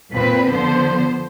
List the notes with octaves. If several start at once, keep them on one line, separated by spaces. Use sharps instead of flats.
A#2 C4 B4
D3 F3 B3 C5